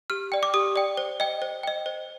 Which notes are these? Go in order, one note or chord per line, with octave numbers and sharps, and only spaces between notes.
G4 F6
D5 G5
D6
G4 D#6
D5 G5
C5
D#5 G5
C5
D#5 G5
C5